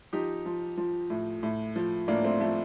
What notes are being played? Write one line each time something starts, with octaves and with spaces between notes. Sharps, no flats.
F3 D#4 G4
F3
F3
A2
A2
F3
A2 A#3 D4
A3 C4
F3 A3